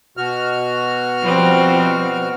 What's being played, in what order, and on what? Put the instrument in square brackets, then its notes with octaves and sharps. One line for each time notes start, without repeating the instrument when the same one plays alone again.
[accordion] B2 F#4 F6
[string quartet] F3 G3 C4